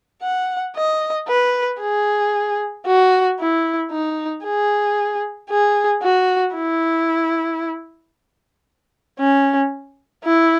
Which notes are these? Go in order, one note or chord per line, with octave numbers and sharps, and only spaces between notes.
F#5
D#5
B4
G#4
F#4
E4
D#4
G#4
G#4
F#4
E4
C#4
E4